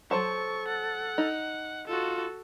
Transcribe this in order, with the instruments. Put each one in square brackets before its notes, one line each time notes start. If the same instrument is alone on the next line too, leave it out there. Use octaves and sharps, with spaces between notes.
[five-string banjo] F#3 C5 A5 [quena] A4 [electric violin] C#6
[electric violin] F#5
[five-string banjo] D#4
[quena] F4 [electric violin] F#4 A4